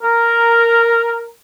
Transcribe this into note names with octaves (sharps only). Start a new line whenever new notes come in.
A#4